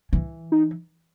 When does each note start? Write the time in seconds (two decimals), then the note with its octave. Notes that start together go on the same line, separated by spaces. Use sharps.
0.13 E3
0.52 D#4